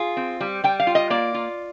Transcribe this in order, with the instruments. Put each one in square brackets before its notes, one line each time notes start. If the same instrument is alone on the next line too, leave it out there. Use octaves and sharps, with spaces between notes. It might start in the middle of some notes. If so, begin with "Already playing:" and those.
Already playing: [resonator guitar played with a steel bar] F4 G#4
C4
G3
G3 G5
F5
F4
D#5
A#3 D5
F4